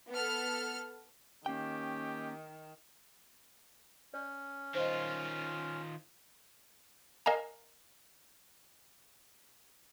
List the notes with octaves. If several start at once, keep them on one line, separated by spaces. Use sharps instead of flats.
B3 A4 F6
D#3 A#3 C#4 G4 G5
C#4 D5
D#3 F4 C5 D#5
A#4 D#5 F5 G#5 A#5